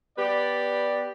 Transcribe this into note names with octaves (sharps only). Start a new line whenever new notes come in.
B3 G4 B4 D5